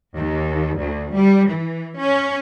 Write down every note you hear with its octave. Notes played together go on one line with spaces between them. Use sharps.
D#2
D2
G3
E3
C#4